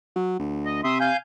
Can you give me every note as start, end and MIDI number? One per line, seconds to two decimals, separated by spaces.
0.16 0.36 54
0.39 0.80 38
0.65 0.81 75
0.84 1.11 48
0.84 0.98 76
0.84 0.98 84
0.84 0.98 87
1.00 1.17 77
1.00 1.17 80
1.00 1.17 91